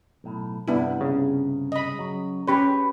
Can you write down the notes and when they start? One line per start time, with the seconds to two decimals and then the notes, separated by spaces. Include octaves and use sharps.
0.24 B1 A2
0.68 G2 C3 B3 D4 E4
1.01 C#3
1.72 D#5 B5
1.99 F#3
2.48 C#4 G4 B4 C#5